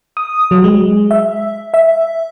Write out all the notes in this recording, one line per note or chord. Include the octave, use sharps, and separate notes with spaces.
D#6
F#3
G#3
E5
E5